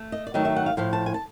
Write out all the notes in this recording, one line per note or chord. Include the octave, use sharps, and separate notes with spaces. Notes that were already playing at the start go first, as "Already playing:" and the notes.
Already playing: A3
D#5
D5
D#3 F#3 A3 D#5
E5
F#5
F5
A2 F3 A3 F5
A5
G#5
A5